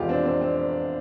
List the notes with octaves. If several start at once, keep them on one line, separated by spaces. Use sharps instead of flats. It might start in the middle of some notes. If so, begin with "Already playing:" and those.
Already playing: F1 E2 B2 G#3 F4 G4
C4 D4
C4
C4